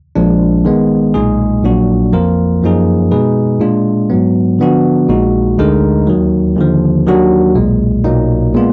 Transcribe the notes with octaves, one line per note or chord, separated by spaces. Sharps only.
A#1 A#2 F3 G#3 D4
D#3 G#3 B3
B1 A#2 G#3 D#4 G#4
A#1 A#2 F#3 D4 F#4
F2 F3 A#3 F4 A#4
F#2 F3 A#3 D#4 G#4
B2 G#3 D#4 G#4 B4
A#2 G#3 D4 F4
G#2 F#3 B3
D3 F3 B3 D4 F#4
A#1 A#2 G#3 D#4 F#4
D2 D3 G#3 D#4 A#4
D#2 D#3 F#3
D#2 D3 F3
D#2 D#3 F#3 D4 F#4
B1 A#2 G#3
B1 A#2 F#3 A#3 D#4
A#2 G#3 B3 F4